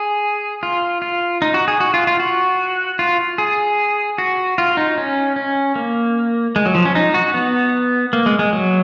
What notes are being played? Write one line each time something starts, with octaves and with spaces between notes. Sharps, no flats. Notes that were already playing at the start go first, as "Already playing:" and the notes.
Already playing: G#4
F4
F4
D#4
F#4
G#4
F#4
F4
F4
F#4
F4
G#4
F#4
F4
D#4
C#4
C#4
A#3
G#3
F#3
F3
C#4
D#4
F#4
B3
A#3
G#3
G#3
F#3